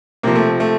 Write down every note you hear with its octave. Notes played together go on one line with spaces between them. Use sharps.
C3 F3 A#3
A3
A3